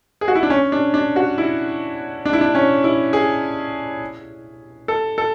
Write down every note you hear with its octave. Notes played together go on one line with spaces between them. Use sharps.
G#4
F#4
E4
D4
C#4
D4
D4
F#4
E4
D4
E4
D4
C#4
E4
G#4
A4
A4